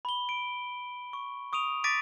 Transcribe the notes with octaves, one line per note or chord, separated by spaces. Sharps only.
B5 G7
D7
C#6
C#6 D#6 D7 D#7 F7
D6 A6 B6 D7 D#7